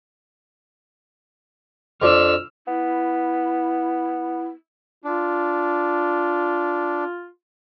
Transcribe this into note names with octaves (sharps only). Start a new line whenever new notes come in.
F2 F3 D4 E6 F6
B3 E4
D4 F4